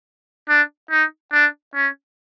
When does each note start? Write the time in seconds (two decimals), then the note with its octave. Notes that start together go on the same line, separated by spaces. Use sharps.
0.49 D4
0.91 D#4
1.33 D4
1.75 C#4